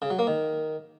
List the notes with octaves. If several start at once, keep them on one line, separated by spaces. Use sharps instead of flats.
C#3
F#3
A#3
D#3